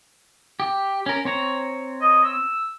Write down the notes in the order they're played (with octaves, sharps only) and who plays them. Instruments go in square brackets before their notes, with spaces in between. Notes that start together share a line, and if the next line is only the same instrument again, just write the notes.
[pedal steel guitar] G4
C#4 A#4
C4 C#5 A#5
[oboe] D#5
E6